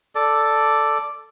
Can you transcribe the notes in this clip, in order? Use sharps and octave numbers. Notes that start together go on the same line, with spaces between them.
A4 D5